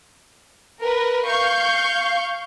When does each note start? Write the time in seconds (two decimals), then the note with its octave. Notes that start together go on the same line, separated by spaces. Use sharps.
0.80 A#4 B4
1.27 F5 C#6 G6